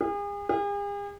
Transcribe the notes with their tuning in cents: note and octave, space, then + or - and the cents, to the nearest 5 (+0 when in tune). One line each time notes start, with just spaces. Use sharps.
G#4 -40
G#4 -45